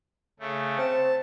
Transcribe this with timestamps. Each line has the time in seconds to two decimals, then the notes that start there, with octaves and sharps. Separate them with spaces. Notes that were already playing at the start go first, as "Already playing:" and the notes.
0.40 C#3 A3
0.78 C4 A5